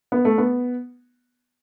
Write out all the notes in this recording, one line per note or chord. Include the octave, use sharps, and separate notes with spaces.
B3
A3
B3